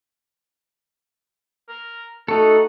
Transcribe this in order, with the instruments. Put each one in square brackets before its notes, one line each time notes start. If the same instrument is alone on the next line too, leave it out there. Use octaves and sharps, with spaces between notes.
[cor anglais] A#4
[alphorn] A3 [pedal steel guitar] D#4 A4 [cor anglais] F#4